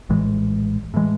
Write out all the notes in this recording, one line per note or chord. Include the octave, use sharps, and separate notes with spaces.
A#1 A2 E3 G#3
A2 E3 G#3